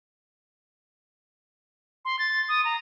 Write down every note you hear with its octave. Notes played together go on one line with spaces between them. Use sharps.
C6
A6
D#6
A#5